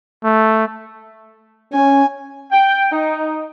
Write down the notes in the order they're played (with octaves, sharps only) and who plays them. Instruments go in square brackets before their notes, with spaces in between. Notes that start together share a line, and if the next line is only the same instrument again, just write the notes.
[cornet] A3
[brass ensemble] C#4 [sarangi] G#5
[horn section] G5
D#4